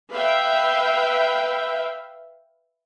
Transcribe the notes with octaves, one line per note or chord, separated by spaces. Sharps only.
B4 E5 F5 G5